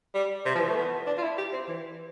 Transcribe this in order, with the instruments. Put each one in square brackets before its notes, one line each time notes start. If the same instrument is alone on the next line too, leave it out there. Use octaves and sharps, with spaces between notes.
[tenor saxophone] G3
C3
F3
E3
A3
B3
D4
F4
E4
G4
C4
E3